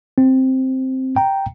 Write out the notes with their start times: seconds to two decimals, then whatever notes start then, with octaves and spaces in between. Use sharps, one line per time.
0.18 C4
1.16 G5 A#5